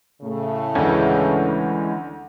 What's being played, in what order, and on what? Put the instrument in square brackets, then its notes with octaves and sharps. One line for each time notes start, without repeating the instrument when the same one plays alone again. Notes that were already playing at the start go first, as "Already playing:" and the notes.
[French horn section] A2 C#3 A3
[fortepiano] D2 [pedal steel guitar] E3 G#3 C#4